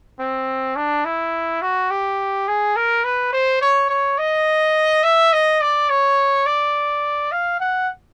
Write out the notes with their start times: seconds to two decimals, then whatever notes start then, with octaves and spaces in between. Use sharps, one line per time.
0.20 C4
0.76 D4
1.05 E4
1.62 F#4
1.91 G4
2.48 G#4
2.76 A#4
3.04 B4
3.33 C5
3.61 C#5
3.89 C#5
4.19 D#5
5.04 E5
5.33 D#5
5.61 D5
5.90 C#5
6.46 D5
7.32 F5
7.60 F#5